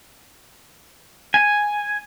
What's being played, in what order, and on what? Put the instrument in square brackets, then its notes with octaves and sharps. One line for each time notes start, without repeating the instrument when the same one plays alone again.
[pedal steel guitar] G#5